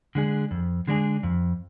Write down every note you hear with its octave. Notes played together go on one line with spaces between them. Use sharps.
D3 G#3 D4 G#4
F2
D3 G#3 D4 G#4
F2